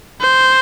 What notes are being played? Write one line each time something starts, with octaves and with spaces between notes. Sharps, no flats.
C5